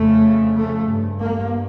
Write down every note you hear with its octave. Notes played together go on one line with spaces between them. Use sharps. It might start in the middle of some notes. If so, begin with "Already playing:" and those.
Already playing: F2 C#3 A3
A3
G2
A#3